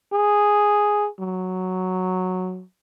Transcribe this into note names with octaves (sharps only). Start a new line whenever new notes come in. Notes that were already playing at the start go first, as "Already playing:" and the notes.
G#4
F#3